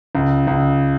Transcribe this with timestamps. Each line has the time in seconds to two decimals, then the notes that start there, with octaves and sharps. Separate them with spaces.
0.15 C#2
0.47 C#2